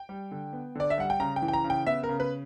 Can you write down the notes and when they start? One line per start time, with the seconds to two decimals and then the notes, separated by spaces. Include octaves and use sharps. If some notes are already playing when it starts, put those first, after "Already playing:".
Already playing: G5
0.09 G3
0.31 D3
0.53 B3
0.75 D3 D5
0.90 E5
0.98 G3 F#5
1.10 G5
1.20 C#3 A#5
1.36 G5
1.42 E3
1.48 G5
1.53 A#5
1.64 C#3
1.70 G5
1.86 B3 E5
2.03 A#4
2.09 C#3
2.20 B4